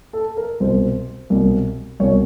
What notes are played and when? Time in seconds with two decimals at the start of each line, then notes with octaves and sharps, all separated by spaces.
0.13 A4
0.37 A#4
0.60 C2 B2 C5
1.30 C2 B2
2.00 C2 C#5
2.04 B2